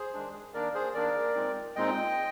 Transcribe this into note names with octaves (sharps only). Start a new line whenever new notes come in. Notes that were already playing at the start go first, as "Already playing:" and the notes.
Already playing: G#4 C5
D#3 G#3 D4
D#3 A#3 D4 A#4 D5
G#4 C5
D#3 A#3 D4 A#4 D5
A#2 G#3 C4 D#4
A#2 G#3 C4 D#4 D#5 G5